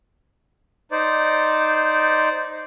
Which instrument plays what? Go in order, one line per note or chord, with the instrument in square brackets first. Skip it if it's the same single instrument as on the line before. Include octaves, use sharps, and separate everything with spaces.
[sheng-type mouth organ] D#4 C5 D5